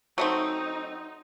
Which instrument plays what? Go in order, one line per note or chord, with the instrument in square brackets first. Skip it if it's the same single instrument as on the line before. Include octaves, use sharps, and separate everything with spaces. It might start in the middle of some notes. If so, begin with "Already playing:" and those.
[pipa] F#3 A3 C4 [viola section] D#4